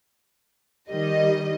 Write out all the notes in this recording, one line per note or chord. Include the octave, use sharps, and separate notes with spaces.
D#3 G3 D#5